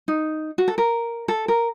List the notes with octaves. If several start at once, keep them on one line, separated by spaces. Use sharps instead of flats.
D#4
F#4
A4
A#4
A4
A#4